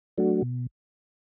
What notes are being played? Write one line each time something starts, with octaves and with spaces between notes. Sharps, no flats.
F#3 A3 D4 F#4
B2